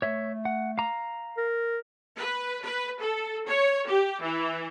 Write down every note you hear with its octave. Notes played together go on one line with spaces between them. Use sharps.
A3 C#5 E5
F#5
F5 A#5
A#4
B4
B4
A4
C#5
G4
E3